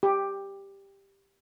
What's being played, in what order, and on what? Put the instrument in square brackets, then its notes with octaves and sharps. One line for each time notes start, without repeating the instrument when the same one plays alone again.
[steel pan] G4